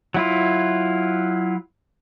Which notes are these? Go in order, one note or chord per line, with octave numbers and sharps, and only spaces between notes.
F#3 E4 F4